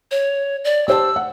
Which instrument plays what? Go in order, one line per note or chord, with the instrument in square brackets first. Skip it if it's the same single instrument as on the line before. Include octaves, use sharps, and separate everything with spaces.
[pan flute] C#5
D5
[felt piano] G4 C5 A5 [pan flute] E6
[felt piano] F#5